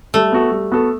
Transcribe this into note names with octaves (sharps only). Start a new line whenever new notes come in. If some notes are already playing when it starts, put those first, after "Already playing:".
G3 A3
B3 F#4 A4
G3
B3 F#4 A4